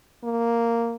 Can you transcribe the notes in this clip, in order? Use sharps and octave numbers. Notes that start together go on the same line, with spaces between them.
A#3